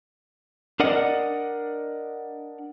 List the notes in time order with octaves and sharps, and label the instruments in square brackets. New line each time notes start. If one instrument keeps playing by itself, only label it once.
[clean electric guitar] D4 A#4 D5 D#5 F#5